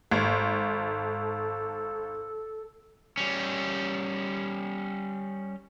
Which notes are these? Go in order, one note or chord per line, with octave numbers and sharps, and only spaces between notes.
G#1 A4
G3 C#4